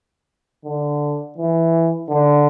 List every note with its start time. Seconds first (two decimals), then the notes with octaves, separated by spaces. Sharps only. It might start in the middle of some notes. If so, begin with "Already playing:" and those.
0.65 D3
1.38 E3
2.09 D3